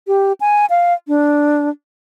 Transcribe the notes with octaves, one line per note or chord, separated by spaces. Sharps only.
G4
G#5
F5
D4